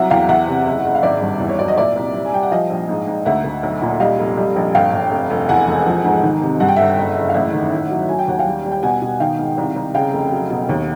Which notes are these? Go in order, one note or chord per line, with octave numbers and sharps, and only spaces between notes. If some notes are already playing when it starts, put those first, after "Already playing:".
Already playing: C2 F#3 E5 F#5
E2 F5 G5
E2 E5 F#5
C3
F#1
F#1
F5
G#1 D5 E5
G2
E2
C#5
F#3 D5
D#5
A#2 D5 E5
C2
G3
G#5
G3 G5
F#5
F3 D#5 F5
A#1
G#2
G#2
D2 E5 F#5
D2
B1
A#2
G3 D#5 F5
F1
G3
A#1
G1 F5 G5
G1
F1
F1
E2 F#5 G#5
E1
F3
G#2
D#3
C3
G2 F#5
G5
G1 E5 F#5
F#1
F#1
F5
A1 E5 F#5
D#3
A2
F#3
F#3 G#5
G5
D#2 F#5
F5 G5
G3
G3
G5
B2 F#5 G#5
B2
D#3 F5 G5
G#2
C2
C2
C#3 F5 G5
F1
F#3
B2
D#2